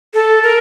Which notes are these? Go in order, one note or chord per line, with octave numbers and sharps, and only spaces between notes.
A4
A#4